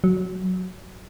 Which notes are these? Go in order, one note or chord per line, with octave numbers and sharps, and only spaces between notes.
F#3